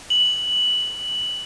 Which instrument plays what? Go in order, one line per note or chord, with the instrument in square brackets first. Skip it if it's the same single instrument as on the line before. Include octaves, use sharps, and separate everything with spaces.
[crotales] F#7